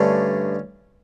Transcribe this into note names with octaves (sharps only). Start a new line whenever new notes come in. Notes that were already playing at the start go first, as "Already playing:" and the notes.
Already playing: G2 D3 A3 C#4